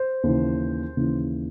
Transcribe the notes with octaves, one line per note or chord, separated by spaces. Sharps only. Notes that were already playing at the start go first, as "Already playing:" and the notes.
Already playing: C5
D#2 C#3 E3
D#2 C#3 E3